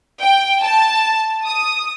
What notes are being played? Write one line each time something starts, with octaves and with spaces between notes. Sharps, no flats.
G5
A5
D#6